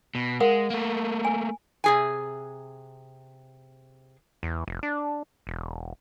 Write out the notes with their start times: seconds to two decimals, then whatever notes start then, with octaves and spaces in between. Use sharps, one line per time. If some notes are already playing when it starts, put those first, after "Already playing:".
0.15 B2
0.40 G#3 A#4 F5 F#5
0.70 A3 A#3
1.25 G#5
1.84 C3 G#4 G#5
4.43 E2
4.68 F1
4.83 D4
5.47 E1